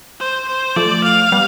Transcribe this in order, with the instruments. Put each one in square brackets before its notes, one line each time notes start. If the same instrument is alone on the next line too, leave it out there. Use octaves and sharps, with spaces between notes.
[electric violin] C5
C5
[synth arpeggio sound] F3 A3 [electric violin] D5
[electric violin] F5
[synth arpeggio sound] G3 B3